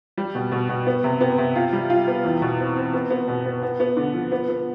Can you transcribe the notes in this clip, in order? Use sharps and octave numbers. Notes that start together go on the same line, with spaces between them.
G3
B2
B2
B2
B3
C3
B3
C3
F4
G3
F4
B3
E2
B2
C4
C4
B3
B3
B2
B3
B3
B3
D3
F3
B3
B3